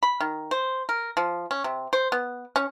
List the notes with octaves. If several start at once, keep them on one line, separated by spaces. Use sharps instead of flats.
B5
D#3
C5
A#4
F3
C#4
C3
C5
B3
C#4